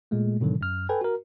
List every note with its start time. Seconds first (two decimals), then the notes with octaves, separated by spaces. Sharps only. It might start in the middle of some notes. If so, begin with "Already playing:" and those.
0.11 A#2 G#3 A3
0.40 G#2 B2 D3 D#3 F#3
0.61 F#2 F6
0.89 A4 B4 G5 G#5
1.01 F#4 A#4